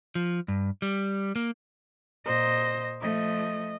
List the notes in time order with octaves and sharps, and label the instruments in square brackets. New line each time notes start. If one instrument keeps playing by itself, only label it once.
[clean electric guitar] F3
G2
G3
A#3
[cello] A#2 D#5 [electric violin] C5 A#6
[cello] F3 A3 [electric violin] D#5